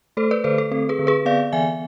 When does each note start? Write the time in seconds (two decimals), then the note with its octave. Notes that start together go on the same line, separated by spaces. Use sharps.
0.17 A3 A4 C5
0.31 B4 D5
0.44 D3 A4 C5
0.58 A4
0.71 C4 A4
0.89 G#4 B4
0.99 D3
1.07 G#4 B4
1.25 B3 D5 F5
1.52 E3 E5 G#5